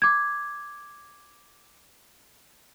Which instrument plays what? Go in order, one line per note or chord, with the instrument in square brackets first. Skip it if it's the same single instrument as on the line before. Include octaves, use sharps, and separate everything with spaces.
[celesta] D6 G#6